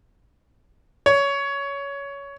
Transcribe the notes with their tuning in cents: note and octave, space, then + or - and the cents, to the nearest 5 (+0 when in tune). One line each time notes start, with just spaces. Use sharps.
C#5 +15